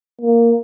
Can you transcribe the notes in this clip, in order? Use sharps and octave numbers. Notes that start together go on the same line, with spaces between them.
A#3